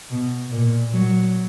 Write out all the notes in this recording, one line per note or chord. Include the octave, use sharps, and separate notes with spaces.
B2
A#2
F#3